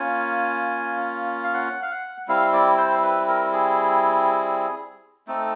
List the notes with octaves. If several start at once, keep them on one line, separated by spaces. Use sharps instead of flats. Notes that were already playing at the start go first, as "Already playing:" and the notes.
Already playing: A#3 C#4 F4 G#5
F5
F#5
F5
F#5
G3 C4 E4 F5
D5
C5
B4
A#4
G#4
A3 C4 D#4 A4